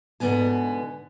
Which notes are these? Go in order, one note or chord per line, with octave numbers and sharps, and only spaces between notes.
G#2 B2 D3 E3 B3 G#5